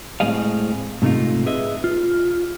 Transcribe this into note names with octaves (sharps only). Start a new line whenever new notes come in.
A2 G#3 C4 G#4 D#5 F5
G#2 C3 A3 D#4 F4
G#4 B4 D#5 E5
F4